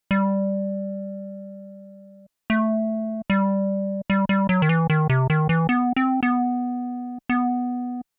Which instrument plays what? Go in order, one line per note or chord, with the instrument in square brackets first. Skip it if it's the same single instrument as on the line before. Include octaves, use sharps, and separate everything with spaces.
[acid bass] G3
A3
G3
G3
G3
F#3
D#3
E3
D#3
C3
D#3
E3
B3
C4
B3
B3